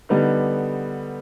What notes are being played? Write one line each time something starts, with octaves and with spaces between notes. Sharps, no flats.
D3 G3 B3 D#4